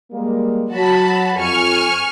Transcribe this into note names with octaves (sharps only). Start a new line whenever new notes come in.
G3 G#3 A#3
F#3 F#4 A5 B5
F2 G#5 C#6 F6